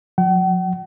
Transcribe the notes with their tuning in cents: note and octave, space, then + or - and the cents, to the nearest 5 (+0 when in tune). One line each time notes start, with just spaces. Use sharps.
F#3 -45 F#5 +45